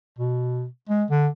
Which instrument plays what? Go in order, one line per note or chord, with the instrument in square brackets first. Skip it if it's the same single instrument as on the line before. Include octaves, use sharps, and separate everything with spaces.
[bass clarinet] B2
G#3
D3